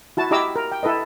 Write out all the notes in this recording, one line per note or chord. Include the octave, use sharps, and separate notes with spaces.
E4 F#4 A5
E4 G4 D#5 A#5 D6 E6
A#4
G5
E4 A4 B4 D#5